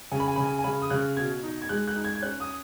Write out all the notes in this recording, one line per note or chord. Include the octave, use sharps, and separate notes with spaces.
C#3 G#5
B5
G#5
C#3 B5
G#5
G#5
C#3 B5
D#6
C#3 F#6
B2 G#6
D#4
G#6
G#3 F#6
F#6
D#4
G#6
G#6
C#4 F#6
D#6